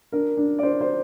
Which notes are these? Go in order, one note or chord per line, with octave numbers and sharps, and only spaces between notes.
D4 A#4
D4
D5
D4 C5
C5